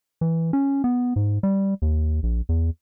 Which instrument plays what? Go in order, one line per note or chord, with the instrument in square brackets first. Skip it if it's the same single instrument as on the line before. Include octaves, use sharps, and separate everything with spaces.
[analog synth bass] E3
C#4
B3
G#2
G3
D#2
A#1
E2